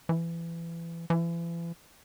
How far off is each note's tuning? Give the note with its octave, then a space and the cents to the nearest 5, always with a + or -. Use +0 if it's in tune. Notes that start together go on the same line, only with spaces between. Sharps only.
E3 +25
E3 +40